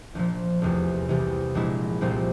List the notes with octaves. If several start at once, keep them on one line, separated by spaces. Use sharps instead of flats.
A#1 A#2 F3
F1 E2 C3
C2 C3 E3
A#1 A#2 G#3 E4
C2 A#2 F3 C4